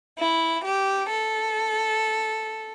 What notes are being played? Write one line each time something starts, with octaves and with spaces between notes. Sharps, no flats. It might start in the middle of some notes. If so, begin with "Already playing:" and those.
E4
G4
A4